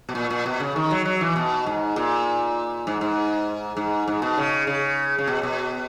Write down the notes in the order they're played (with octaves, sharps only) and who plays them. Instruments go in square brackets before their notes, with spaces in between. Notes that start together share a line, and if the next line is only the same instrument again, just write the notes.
[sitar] B2
A#2
A#2
B2
C#3
D#3
F#3
F#3
E3
B2
G#2
A#2
G#2
G#2
G#2
G#2
B2
C#3
C#3
C#3
B2
B2